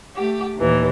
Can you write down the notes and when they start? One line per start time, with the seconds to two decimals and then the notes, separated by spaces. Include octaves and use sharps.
0.16 A3 G4
0.56 D#2 A#2 E3